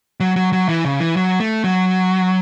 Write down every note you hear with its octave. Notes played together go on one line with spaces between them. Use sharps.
F#3
F#3
F#3
E3
C#3
E3
F#3
A3
F#3